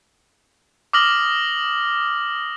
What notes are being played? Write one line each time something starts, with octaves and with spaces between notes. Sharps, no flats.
D6 D#6 F6 A#6 F#7